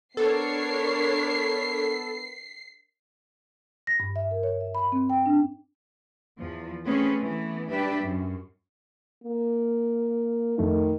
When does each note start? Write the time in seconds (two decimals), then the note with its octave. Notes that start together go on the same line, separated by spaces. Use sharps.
0.17 B3 D4 A4 A#4 C#5 C7
3.87 A#6
4.00 G2
4.16 E5
4.31 A#4
4.43 C#5
4.61 E5
4.75 B5
4.92 C4
5.10 G5
5.26 D4
6.38 E2 F3
6.86 A3 C4 C#4 G#4 B4
7.22 E3 A3 B3
7.70 G3 D4 G4 B4 E5
8.04 F#2
9.24 A#3
10.58 F2 D#3 A3 D#4